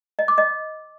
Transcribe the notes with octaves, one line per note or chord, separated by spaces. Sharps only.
D#5
D6
D#5